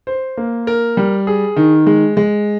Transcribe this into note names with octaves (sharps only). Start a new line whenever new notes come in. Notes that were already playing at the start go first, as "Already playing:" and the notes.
C5
A#3
A#4
G3
G#4
D#3
G#3
G#3